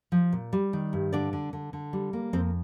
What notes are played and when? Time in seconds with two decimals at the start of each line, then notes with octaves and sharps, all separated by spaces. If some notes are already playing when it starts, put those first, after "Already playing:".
0.12 F3
0.33 A#2
0.53 G3
0.73 D#3
0.93 G2
1.13 D3 D4 D5
1.33 D3
1.53 D3
1.73 D3
1.93 G3
2.13 A#3
2.33 F2 C4 C5